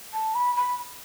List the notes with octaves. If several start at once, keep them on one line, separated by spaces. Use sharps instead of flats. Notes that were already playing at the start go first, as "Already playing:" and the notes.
A5
B5
B5